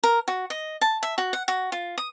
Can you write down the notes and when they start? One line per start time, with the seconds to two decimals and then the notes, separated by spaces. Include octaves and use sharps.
0.04 A#4
0.28 F#4
0.50 D#5
0.81 A5
1.03 E5
1.18 F#4
1.33 F#5
1.48 F#4
1.72 F4
1.98 D#6